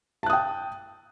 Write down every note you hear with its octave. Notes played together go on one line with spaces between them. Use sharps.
G5 A5 D#6 F#6